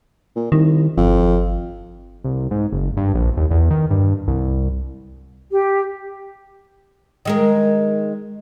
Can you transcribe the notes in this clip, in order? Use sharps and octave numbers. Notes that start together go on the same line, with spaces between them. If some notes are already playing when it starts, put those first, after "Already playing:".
A#2
C2 D#3
G1 F2
C2
G#2
F#1
G2
A#1
D#2
E2
D#3
G2
C2
G4
D#3 G#3 A#4